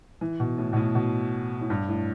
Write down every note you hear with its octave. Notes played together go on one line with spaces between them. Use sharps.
E3
B2
A2
B2
A2
B2
A2
G2
A2